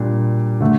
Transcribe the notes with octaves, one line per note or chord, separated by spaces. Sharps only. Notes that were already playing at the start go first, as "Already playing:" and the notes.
Already playing: A#2 G3 D4
D3 A3